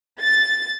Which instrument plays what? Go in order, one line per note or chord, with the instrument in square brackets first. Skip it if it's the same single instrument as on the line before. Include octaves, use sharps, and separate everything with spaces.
[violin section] A6